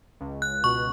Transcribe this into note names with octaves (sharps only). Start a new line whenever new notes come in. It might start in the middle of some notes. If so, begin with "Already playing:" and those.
C#2
F#6
B2 C#6